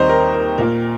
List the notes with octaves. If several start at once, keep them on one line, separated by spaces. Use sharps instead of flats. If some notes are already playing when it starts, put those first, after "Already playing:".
Already playing: D#2 D#3 G3 C4 C5 D#5 A#5
A#4
A#4
A#2 A#3 A#4